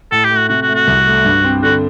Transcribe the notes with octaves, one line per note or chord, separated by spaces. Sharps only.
A2 A4
G4
A3
F#4
C3 F#4
F#4
A3
F#4
C2
A3
G2
C4
D3 F#4